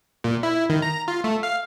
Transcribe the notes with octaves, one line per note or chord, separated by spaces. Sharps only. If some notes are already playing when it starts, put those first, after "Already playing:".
A#2
E4
D#3
A#5
F4
A3
F5